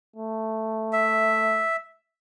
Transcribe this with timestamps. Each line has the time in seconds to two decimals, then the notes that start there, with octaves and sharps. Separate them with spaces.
0.16 A3
0.93 E5